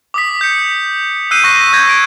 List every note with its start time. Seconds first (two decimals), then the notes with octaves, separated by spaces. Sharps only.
0.14 D6 D#6 B6
0.41 G6 C#7
1.31 E6 F#6 G6 C7 D#7
1.44 C#6 F#6 A#6
1.73 E6 G6 G#6 A#6
1.89 D7